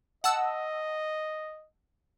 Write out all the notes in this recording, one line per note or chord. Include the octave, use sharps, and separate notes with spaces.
D#5 F#5 A5 E6